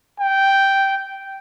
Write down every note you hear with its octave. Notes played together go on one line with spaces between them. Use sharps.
G5